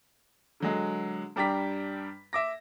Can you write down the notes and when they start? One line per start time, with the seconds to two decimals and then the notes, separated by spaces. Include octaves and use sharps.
0.60 D3 F#3 G#3
1.36 G2 G3 D4 G4 A#5 B6
2.33 E5 D6 A#6